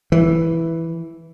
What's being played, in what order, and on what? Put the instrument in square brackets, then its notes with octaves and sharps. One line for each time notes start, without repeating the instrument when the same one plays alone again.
[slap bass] E3